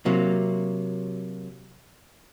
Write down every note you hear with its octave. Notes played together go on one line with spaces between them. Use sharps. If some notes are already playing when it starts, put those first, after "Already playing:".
C3 F#3 A#3